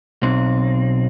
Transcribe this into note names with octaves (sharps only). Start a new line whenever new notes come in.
B1 C4